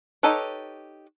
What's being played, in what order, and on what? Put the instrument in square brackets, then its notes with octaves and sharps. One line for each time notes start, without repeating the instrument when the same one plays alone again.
[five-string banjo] D#4 G4 A4 B4 C#5